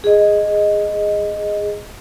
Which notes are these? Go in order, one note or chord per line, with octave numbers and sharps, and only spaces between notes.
G#4 D#5